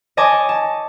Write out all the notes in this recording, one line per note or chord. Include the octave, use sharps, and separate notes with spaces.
C#5 D#5 G#5 A5 C#6 D6
A5